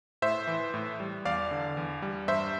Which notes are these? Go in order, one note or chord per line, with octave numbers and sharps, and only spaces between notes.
A2 C5 E5
E3
A2
G3
E2 D5 F5
D3
E2
G3
G2 C5 E5